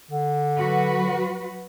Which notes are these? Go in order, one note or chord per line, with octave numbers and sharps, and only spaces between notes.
D3
F#3 F#4 B4